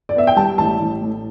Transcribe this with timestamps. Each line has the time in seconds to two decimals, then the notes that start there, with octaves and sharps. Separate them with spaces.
0.09 D5
0.15 B3 E5
0.27 G5
0.36 G3 A5
0.58 A1 A5
0.80 A1
1.01 A2